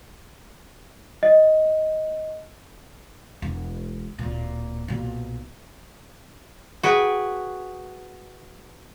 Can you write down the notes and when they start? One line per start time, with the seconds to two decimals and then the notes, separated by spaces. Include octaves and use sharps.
1.23 D#5
3.42 E1
4.19 D1 A#2
4.88 B1 A#2
6.83 F#4 G#4 B4 G5